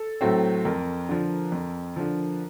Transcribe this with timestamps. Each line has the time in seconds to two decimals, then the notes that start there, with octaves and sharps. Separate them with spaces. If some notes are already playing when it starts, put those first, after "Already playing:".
Already playing: A4
0.21 A2 F#3 A3 C4
0.65 F2 A#4
1.09 D3 F3
1.52 F2
1.96 D3 F3